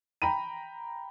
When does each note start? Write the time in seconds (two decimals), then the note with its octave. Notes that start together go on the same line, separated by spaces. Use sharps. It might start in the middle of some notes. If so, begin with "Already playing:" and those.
0.22 G5 A#5 B5 D#7